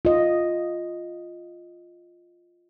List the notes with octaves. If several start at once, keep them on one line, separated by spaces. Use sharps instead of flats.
F4 D#5